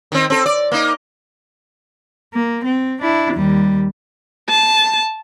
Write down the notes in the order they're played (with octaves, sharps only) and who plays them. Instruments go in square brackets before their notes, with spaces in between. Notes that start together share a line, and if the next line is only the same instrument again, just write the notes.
[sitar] D#3 C4
C4 A4
D5
A#3 D#4
[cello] A#3
C4
D4 E4
D#2 G3
[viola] A5